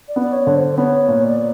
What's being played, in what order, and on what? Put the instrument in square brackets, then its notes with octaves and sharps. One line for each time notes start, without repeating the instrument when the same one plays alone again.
[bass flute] D5
[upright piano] B3
[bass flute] D5
C#5
[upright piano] D3
[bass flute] C5
[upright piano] B3 [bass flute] C#5
[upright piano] A#2
[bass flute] D5